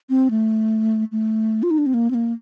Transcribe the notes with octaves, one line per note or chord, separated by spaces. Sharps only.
C4
A3
A3
F4
D#4
D4
C4
A#3
C4
A#3